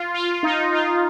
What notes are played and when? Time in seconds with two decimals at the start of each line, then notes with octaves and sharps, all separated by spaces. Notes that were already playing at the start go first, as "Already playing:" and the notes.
Already playing: F4
0.14 F4
0.31 F4
0.43 D#4
0.72 F4